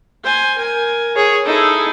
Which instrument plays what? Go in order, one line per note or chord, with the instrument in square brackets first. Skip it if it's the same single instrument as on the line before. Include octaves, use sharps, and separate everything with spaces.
[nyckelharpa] C5 G#5
A#4 G#5
[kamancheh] G#4 C#5
[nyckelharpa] D#4 E4 [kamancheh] G#4 A4